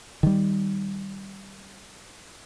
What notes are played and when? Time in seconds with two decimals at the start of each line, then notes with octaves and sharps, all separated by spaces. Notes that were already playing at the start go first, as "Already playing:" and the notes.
0.23 D#3 G3